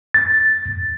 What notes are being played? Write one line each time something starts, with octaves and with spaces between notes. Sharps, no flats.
A6